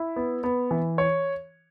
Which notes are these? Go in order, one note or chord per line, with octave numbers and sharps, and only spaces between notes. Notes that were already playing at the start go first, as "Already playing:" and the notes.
Already playing: E4
B3
B3
E3
C#5